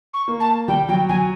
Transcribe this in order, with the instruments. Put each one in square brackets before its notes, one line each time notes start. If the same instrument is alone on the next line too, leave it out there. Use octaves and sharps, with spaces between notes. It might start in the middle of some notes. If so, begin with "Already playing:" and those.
[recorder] C#6
[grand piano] A#3
[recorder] A5
[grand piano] G3 [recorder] G5
[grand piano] F#3 [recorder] G5
[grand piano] F#3 [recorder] G#5